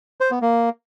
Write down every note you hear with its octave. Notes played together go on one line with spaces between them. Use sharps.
C5
B3
A#3